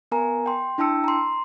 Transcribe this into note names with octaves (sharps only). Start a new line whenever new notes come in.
B3 A#4 G#5 A#5
G5 C6
D4 E4 G5 A5 E6 C#7
A#5 C6